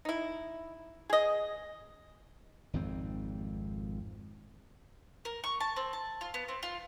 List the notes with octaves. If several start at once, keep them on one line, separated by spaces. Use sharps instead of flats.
D#4 E4
G#4 D#5
G#1 F2 G#2 C4
A#4
C#6
A5
C4
A5
F4
B3
C4
F4